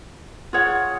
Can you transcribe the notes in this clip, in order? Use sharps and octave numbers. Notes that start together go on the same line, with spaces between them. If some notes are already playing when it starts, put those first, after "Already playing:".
F4 G#4 C#5 F#5